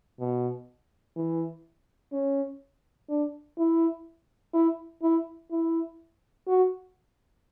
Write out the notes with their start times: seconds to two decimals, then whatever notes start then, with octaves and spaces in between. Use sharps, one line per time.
0.20 B2
1.16 E3
2.13 C#4
3.09 D4
3.58 E4
4.54 E4
5.02 E4
5.51 E4
6.48 F#4